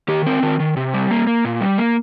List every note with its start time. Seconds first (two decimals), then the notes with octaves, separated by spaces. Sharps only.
0.08 D#3 G4
0.26 C4 A#4
0.43 D#3 A#4
0.60 D#3
0.77 C3
0.94 G3
1.11 A#3
1.27 A#3
1.45 A#2
1.61 G3
1.78 A#3